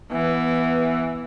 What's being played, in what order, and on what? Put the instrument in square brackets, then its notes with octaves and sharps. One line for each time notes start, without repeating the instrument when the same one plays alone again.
[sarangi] E3 [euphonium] B3